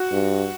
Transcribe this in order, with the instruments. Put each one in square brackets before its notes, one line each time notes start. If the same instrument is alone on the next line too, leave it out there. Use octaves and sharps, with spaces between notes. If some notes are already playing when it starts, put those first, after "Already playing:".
Already playing: [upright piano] F#4
[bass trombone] G2